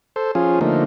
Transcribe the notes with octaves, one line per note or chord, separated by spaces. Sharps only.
A4 C5
F3 C#4 F4 G#4
D3 F3 A3 A#3 D#4